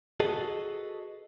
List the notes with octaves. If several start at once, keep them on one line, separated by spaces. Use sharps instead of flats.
F#4 G#4 A4 B4 D#5